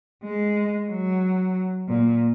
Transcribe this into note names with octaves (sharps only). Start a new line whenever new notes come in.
G#3
F#3
A#2